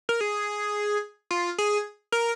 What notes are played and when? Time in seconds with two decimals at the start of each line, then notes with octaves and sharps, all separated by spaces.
0.09 A#4
0.21 G#4
1.31 F4
1.58 G#4
2.12 A#4